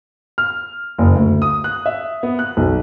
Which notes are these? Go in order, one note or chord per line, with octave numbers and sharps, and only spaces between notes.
F6
F#1
D2
D#6
F#6
E5
B3
F#6
B1